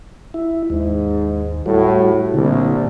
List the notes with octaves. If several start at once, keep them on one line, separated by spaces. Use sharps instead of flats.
E4
D#2 G#2
A2 G3 F#4
C2 A#2 D3